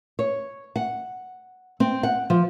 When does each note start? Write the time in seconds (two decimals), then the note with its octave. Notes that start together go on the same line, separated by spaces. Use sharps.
0.19 C#5
0.76 F#5
1.80 C4
2.03 F#5
2.30 F3